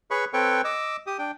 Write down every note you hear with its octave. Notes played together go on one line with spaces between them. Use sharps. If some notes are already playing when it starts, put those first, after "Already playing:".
G#4 B4 C#5 B5 C#6
C4 A4 B4 C#5 G5 C#6
D#5 D6 E6
G4 D#6
D4 G5